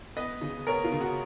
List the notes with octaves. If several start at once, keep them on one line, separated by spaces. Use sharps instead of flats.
B3 B4 D#5
C#3
B3 A#4 C#5
F4
C#3
F#4